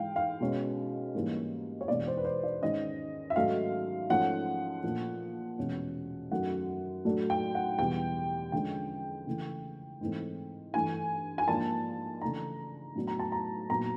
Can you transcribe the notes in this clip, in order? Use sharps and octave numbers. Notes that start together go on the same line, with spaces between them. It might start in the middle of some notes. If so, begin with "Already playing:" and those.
Already playing: G#2 E3 G#3 F5 G5
F5
B2 G#3 C#4
G#2 E3 G3 A#3 C#4
C#5
E2 B2 G#3 B3 D4 D5
C5
B4
C5
D5
G#2 D#3 G#3 C#4 D#5
E5
G#2 D#3 F#3 A3 C#4 F5
G#2 F3 A3 C#4 F#5
A#2 F3 A3 D4
E2 B2 G#3 C#4
F#2 D#3 F#3 A3 F#5
A2 F#3 A3 D4
G5
F#5
E2 B2 G3 G5
D3 F3 G#3 C#4 G5
C#3 E3 A3
G#2 E3 A3 C4
G2 E3 A3 G#5
G#5
G#2 F3 A#3 D4 A5
C#3 E3 A3 D4 A#5
A2 F#3 B3 D4
A#5
A5
A#5
A#2 F#3 B3 A#5